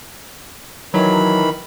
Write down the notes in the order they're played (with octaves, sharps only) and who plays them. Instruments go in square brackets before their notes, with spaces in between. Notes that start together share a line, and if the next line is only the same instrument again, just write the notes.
[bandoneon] D#3 E3 B5 [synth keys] F#3